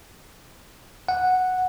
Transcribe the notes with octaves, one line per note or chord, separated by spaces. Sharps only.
F#5